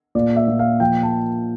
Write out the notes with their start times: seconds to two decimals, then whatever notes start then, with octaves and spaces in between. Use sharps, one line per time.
0.15 A#2 D5
0.36 E5
0.48 A#2
0.59 F5
0.80 F3 G5
1.03 A5